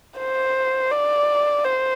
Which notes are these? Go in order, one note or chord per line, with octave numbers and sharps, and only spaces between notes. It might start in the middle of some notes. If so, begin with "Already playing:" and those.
C5
D5
C5